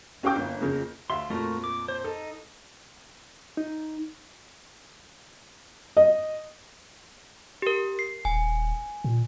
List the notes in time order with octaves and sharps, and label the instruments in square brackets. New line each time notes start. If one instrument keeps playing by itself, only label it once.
[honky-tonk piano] C#4 F#4 F5 G5 D6 G6
G1 A#3
F2 C#3 A#3
[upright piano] D2 E5 F5 [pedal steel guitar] C6
[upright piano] F2 A#2 [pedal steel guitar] A3 F#4 A#4
[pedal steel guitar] D6
C5
[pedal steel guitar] D#4 [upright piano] A4
[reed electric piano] D#4
[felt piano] D#5
[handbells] G4 A#4
C7
[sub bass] D#1 [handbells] G#5
[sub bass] A#2